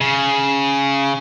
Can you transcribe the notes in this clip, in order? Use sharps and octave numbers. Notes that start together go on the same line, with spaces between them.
C#3